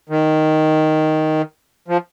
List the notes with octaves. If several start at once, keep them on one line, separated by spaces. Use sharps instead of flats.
D#3
F3